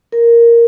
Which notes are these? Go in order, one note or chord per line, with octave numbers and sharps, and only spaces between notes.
A#4